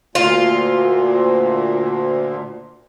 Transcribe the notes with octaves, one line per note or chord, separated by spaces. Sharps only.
D2 A#2 F4